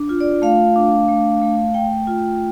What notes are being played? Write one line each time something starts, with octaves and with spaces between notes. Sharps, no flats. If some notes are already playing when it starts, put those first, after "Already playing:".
Already playing: D4
F4
D5
A3 F5
D4
A3
A3
A3 G5
F4